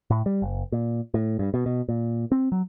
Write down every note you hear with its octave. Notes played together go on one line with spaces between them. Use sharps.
A2
G3
F#1
A#2
A2
G2
B2
B2
A#2
C4
F#3